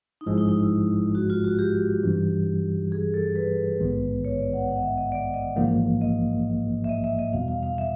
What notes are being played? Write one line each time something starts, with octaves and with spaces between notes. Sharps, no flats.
D#4
G#1 G#2 F3 G#3 E4
D#4
D#4
E4
F#4
F4
F#4
G4
G2 E3 G3 C4 D#4
G#4
A4
B4
A#1 G#2 D#3 G#3 B3
C#5
D5
F#5
F#5
D#5
E5
D#5
D5
D#5
A1 G#2 F3 A#3 F5
D#5
E5
D#5
E5
D#5
E2 B2 G3 F5
F5
F5
E5